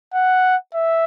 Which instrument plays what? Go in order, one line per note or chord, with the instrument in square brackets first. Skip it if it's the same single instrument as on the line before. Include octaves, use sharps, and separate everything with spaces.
[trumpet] F#5
E5